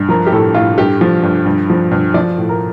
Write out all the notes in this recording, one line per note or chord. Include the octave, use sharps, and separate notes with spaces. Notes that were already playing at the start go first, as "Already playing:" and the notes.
Already playing: G2
F3 A#4
G4
A2 A4
A2 F4
G2 G4
F3
G2
G2
F3
G2
F3 D5
A2
A#4